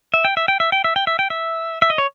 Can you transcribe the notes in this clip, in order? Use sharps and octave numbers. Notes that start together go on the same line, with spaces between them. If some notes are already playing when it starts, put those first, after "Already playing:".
E5
G5
E5
G5
E5
G5
E5
G5
E5
G5
E5
E5
D#5
C#5